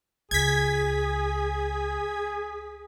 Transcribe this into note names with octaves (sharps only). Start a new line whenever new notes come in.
C#2 G#4 G#6 B6